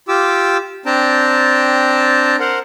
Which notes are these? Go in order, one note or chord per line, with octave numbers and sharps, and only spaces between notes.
F4 G4 D6 E6
C4 D4 G5 A5 A#5
A#4 C5 F#5